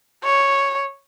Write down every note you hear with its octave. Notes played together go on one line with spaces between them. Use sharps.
C#5